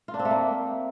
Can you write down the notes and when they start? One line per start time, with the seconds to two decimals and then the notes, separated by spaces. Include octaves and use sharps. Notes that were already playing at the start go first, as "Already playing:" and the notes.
0.08 F4
0.14 D4
0.19 C4
0.25 A3
0.31 A#3